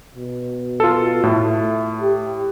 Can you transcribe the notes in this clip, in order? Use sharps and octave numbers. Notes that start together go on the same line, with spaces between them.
B2
F4 A4
A2 A3
G4